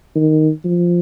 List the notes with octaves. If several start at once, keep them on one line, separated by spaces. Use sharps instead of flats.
D#3
F3